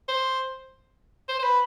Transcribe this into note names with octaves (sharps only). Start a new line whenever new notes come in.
C5
C5
C5
B4